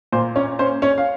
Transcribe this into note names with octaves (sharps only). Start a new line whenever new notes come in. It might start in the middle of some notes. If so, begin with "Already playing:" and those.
A#2 C5
C#4 C#5
C#4 C5
C#4 C#5
F5